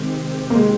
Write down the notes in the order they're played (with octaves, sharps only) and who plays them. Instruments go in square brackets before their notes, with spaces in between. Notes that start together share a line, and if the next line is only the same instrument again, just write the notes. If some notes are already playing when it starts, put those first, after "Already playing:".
Already playing: [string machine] C3 D#3 G#3 C4 G4
[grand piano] A#3
G#3